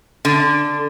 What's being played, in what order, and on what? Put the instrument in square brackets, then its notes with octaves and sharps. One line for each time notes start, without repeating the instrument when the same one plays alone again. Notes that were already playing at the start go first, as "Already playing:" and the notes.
[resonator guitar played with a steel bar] D3